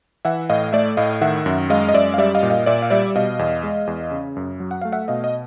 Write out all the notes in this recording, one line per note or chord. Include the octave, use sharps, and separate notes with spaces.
E3 E5 F#5
A2 D#5 F5
A3 D5 E5
A2 D#5 F5
D#3 E5 F#5
F#2
G#3 D#5 F5
D#5
F#2 D5 E5
F5
G3 D5 E5
D#5 F5
A#2
D#5 F5
A#2 D5 E5
F5
G3 D5 E5
B2 D#5 F5
E2
G#3
E2
C#3
F#2
F#3
F#5
A3 F5
E5 F#5
B2 D#5 F5
D#5